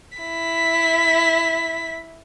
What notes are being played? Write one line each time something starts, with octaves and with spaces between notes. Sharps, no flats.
E4 B6